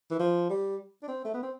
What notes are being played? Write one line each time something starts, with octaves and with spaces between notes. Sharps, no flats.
E3
F3
G3
D4
C4
A3
B3
C4